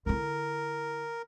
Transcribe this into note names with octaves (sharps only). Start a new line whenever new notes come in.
D3 E4 A#4